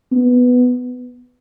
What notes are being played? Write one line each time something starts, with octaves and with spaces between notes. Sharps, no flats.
B3